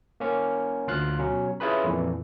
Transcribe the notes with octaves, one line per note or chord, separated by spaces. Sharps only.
A#3 C#4
D2 F4 F5 F#6
B2 F#3 C#4
C#4 E4 F4 G#4 B4 B5
F2 A#2 E3